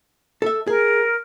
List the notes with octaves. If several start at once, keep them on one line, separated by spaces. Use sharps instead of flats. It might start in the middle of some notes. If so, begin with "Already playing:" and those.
A4 E5
G#4 A#4